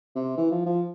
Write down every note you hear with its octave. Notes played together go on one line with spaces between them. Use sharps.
C3
E3
F3
F3